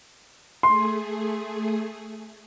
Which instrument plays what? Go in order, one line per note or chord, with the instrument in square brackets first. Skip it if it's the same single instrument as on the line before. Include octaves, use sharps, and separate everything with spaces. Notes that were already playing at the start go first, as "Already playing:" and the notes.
[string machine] A3 G#4 [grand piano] C6